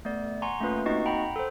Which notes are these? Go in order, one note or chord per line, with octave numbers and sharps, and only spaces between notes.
A3 B3 D5
F#5 G#5 A#5 C6 C#6
A3 A#3 C#4 F4 B4
A#3 C4 D#4 F#4 D#5 C#6
F#5 G5 A#5 B5
A4 C5